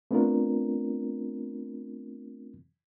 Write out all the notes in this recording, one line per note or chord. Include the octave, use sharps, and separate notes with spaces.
A3 B3 C4 D4 F4 A#4